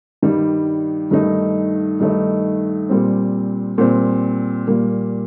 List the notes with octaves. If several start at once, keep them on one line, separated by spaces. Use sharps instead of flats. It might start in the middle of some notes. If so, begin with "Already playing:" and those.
G2 D#3 G3
G2 D#3 A3 D#4
G2 D#3 A3 D#4
A#2 G3 C4
A#2 G3 C4
A#2 G3 A#3